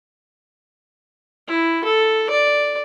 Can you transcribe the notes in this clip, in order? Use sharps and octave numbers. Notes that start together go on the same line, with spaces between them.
E4
A4
D5